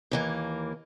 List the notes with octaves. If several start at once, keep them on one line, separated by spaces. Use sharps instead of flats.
D#2 E3 A#3